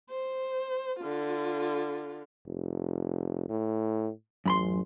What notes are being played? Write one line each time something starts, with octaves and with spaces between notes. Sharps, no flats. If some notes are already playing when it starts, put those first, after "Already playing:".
C5
D3 F4
F1
A2
A1 F#2 B5 C6